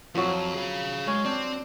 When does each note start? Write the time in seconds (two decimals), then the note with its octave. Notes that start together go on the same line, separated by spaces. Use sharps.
0.15 F2 F3 F#3
0.54 G#4 F5
1.07 G#3 C#4
1.25 C4 D4